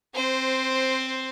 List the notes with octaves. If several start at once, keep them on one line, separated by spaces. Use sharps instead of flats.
C4 C5